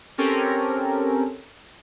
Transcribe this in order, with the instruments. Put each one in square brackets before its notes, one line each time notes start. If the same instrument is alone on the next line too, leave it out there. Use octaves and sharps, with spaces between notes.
[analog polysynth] C4 C#4 G4 A4 A#4